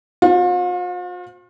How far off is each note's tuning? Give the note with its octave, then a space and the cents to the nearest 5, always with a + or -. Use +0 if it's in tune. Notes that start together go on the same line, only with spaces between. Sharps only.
C4 +0 F4 +45 F5 +10